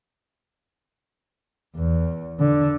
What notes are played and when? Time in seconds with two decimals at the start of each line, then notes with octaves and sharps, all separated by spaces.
1.76 E2
2.40 D3